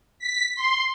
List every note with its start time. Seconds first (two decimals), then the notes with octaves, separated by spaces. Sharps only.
0.19 B6
0.56 C6